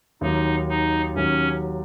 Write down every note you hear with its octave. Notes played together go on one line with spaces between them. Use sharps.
D#2 D#3 F#3 D#4
D#4
D#2 D#3 F#3 C#4